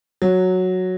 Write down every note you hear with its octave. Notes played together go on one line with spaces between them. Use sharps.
F#3